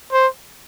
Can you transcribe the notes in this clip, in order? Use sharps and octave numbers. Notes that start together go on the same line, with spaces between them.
C5